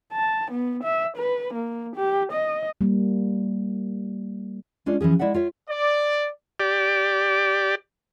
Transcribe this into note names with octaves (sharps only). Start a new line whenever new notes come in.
A5
B3
E5
B4
A#3
G4
D#5
G3 A#3
G#3 C#4 D4 F4
E3 F3 C#4 G#4
G#3 E4 D5 E5 F#5
F4 C#5 E5
D5
G4 D5